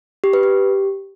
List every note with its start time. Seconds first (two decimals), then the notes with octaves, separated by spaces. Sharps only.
0.24 G4
0.33 B4
0.43 G4